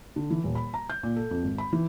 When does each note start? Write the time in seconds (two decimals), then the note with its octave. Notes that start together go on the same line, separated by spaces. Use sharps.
0.16 D3
0.30 E3
0.44 D#1
0.55 B5
0.74 A#5
0.90 G6
1.03 A#2
1.16 A4
1.31 F2
1.43 G#1
1.58 B5
1.73 E3